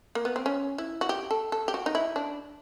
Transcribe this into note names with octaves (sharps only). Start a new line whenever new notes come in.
A#3
B3
C4
C#4
E4
F#4
G4
A4
A4
G4
F#4
D#4
E4
D4